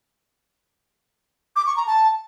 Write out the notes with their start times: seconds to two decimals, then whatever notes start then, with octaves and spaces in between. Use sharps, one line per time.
1.56 D6
1.66 C#6
1.77 A#5
1.87 A5